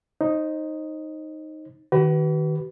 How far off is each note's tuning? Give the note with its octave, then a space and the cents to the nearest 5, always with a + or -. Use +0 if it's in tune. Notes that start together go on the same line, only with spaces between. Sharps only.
D#4 +0 C5 +30
D#3 +0 F#4 +45 B4 +0